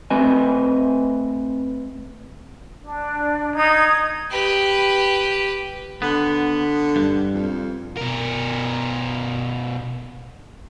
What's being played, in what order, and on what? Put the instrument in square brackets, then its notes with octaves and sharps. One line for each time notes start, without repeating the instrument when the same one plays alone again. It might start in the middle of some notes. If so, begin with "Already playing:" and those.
[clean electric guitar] A3 C4 B4 D#5 G#5
[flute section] D4
[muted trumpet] D#4 [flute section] D#6 G#6
[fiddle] G4 B4
[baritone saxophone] D3 [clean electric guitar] B3
[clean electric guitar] G2
[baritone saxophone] F2
[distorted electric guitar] B2 A#4